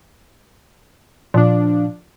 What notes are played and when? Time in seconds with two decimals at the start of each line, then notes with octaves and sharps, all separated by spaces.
1.34 A#2 F3 D4